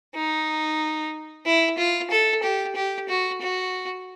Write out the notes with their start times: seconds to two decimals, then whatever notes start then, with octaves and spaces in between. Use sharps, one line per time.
0.15 D#4
1.45 E4
1.78 F4
2.11 A4
2.43 G4
2.76 G4
3.09 F#4
3.41 F#4